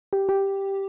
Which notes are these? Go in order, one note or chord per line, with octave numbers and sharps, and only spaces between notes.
G4
G4